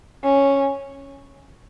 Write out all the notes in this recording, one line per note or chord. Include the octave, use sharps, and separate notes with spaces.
C#4